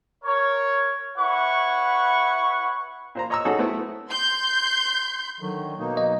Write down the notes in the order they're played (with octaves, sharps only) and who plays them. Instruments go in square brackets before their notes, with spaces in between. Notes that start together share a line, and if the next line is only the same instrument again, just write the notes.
[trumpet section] A#4 C#5
E4 B4 C#5 F#5 C#6
[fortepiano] A#2 C5 A#5
C#5 D#5 A#5 C#6 E6
F#3 C#4 D#4 F#4 G#4 A4
A3 B3 C4 E4
[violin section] C6 G6
[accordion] D3 D#3 [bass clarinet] F#3
[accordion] B2 A#3 D#4
[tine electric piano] D#5